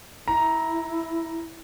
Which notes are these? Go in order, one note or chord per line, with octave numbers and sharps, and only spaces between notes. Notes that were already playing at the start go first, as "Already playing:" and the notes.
E4 A#5